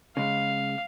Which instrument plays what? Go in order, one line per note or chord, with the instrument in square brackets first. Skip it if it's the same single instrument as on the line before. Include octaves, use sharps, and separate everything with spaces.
[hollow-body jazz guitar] C#3 G#3 [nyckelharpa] F5